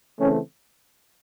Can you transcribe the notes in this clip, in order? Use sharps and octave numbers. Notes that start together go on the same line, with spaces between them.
C#3 E3 A3 C4 C#4